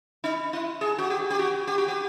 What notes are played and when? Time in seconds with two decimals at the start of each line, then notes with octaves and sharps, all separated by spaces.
0.24 D#4
0.53 E4
0.81 G#4
0.98 F#4
1.10 G4
1.30 G4
1.39 F#4
1.67 G4
1.78 F#4
1.88 G4